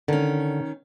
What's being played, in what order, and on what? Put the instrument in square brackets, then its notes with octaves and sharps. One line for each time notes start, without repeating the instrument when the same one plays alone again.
[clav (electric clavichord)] D3 [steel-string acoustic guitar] D#3 C#4